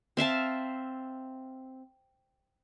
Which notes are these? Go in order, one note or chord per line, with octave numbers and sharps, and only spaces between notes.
C4 E5 F5 A5